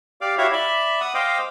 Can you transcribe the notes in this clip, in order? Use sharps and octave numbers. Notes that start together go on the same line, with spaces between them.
G4 D5 F5 D6
E4 F#4 G4 C#5 E5 F5
D5 E5 B5
F#5 D#6
C5 D#5 F5 G5 D6